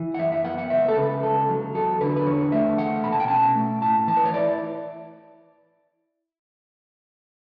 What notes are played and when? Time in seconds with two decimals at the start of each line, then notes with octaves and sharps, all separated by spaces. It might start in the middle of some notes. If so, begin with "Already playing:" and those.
Already playing: E3
0.14 F#5
0.19 F#2 E5
0.32 E5
0.45 B3 F#5
0.58 F#5
0.70 C#2 E5
0.88 A4
0.97 C#3 B4
1.23 C#2 A4
1.49 F#3
1.75 E2 A4
2.01 D3 B4
2.17 B4
2.26 E2 C#5
2.52 A3 E5
2.78 E2 F#5
3.04 B2 B5
3.12 A5
3.20 G5
3.28 C#4 A5
3.55 A3
3.82 A2 A5
4.07 E3 A5
4.17 B4
4.25 C#5
4.34 E4 D5